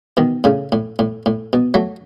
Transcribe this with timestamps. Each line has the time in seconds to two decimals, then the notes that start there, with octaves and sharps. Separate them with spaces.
0.17 B2 D#3
0.44 A2 C#3
0.72 A2
0.99 A2
1.26 A2
1.53 B2
1.74 F#3 A3